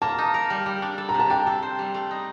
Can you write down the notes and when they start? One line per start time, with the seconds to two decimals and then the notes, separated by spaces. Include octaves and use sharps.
0.02 A#3 A5
0.18 D#4
0.34 A#4
0.50 G3
0.66 G3
0.82 D4
0.98 A4
1.09 A#5
1.14 C3
1.20 A5
1.30 D4 G5
1.47 A4
1.62 C5
1.79 G3
1.94 A3
2.11 D#4